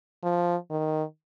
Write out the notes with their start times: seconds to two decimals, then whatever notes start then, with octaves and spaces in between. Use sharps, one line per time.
0.23 F3
0.70 D#3